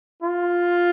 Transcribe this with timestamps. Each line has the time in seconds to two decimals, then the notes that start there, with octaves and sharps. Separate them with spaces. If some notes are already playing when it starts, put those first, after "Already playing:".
0.23 F4